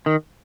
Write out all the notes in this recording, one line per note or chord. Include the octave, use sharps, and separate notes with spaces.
D#3